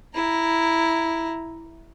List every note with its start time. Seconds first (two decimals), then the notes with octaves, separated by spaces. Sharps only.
0.15 E4 A#5